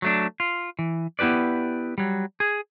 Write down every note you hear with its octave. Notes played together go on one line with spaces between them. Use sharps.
F#3 A3 D4
F4
E3
B3 E4 G4 B4 D5
F#3 G3
G#4